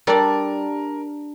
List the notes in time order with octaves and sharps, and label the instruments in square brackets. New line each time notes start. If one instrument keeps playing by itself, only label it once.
[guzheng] G3 D4 A4 D5 [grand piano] A#4